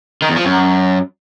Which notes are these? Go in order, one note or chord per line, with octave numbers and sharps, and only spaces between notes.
D#3
E2
F3
F#2